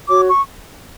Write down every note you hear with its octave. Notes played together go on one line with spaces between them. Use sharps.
F#4 C#5 D6
C#6